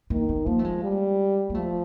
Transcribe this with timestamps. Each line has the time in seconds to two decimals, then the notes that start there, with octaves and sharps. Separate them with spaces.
0.10 D#3 A#3
0.29 B3
0.46 F3 A#3
0.59 A3
0.65 G#3
0.83 G3
1.50 A#3
1.54 F3 A3